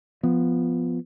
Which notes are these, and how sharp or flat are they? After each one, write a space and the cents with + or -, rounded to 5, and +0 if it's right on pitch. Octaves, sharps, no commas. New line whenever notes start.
F3 +0 B3 +5